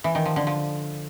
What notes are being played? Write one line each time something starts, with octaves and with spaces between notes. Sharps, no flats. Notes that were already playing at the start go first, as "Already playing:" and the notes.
E3
D#3
F3
D3
F3